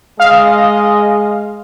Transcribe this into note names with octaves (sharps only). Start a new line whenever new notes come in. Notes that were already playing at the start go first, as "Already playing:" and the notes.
G#3 D#5 F5